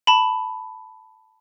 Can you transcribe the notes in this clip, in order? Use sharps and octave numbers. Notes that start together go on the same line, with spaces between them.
A5 B5